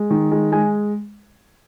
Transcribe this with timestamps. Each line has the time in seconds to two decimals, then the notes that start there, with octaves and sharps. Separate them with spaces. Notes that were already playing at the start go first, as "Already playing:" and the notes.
Already playing: G#3
0.11 D#3
0.32 G#3
0.52 G#3 G#5